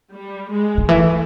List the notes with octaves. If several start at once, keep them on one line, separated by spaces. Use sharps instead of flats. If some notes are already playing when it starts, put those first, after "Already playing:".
G3
G#3
D#3
E3 A3